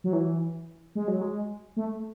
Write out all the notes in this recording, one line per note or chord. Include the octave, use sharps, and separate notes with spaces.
F#3
E3
G#3
F#3
G#3
A3